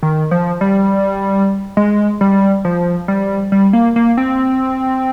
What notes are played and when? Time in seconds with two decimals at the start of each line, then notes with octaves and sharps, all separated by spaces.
0.03 D#3
0.31 F3
0.61 G3
1.77 G#3
2.21 G3
2.65 F3
3.08 G3
3.52 G3
3.73 A#3
3.96 A#3
4.17 C4